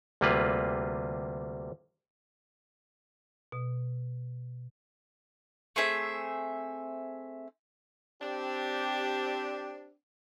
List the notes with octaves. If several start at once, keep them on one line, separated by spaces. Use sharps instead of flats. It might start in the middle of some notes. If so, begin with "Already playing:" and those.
D2 C3 G3 A#3 F4 B4
B2
A3 C4 G#4 E5
C4 D4 G4